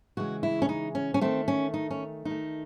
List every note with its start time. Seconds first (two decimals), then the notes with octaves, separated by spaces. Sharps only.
0.17 C#3 E3 G#3 F#4
0.43 E4
0.62 C#4
0.69 D#4
0.95 C#4
1.14 C#4
1.21 D#3 A3 C4
1.48 C#4
1.74 D#4
1.91 C#4
2.25 D#3 A3 D#4